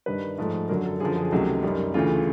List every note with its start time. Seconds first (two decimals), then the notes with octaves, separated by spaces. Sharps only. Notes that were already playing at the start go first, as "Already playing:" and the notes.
0.06 G2 D#3 G3 B4
0.38 G#2 F3 A3
0.69 F#2 D3 F#3 A#4
0.85 A4
1.00 F#2 D3 F3 G#4
1.16 G#4
1.32 C#2 C3 D#3 F#3 A3 G4
1.63 F#2 D#3 G3
1.94 D2 C#3 E3 A3 F4